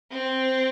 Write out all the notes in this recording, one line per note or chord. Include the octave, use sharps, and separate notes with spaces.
C4